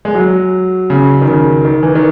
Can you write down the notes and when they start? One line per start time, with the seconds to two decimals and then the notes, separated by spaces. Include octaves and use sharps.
0.05 G#3
0.15 F#3
0.90 C#3
1.21 D#3
1.28 C#3
1.65 D#3
1.83 E3
1.95 D#3